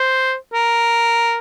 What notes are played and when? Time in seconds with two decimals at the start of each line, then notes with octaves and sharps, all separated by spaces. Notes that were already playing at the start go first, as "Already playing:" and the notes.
Already playing: C5
0.54 A#4